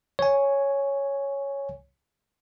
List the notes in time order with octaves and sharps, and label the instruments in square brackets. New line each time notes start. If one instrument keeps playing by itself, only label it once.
[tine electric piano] C#5 G#5